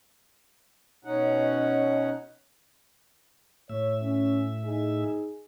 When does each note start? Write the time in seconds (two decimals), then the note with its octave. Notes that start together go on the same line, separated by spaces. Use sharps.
1.05 B2 C#4 D#4 F#5
3.69 A2 C#5 E5
4.02 C#4
4.65 D#4 G#4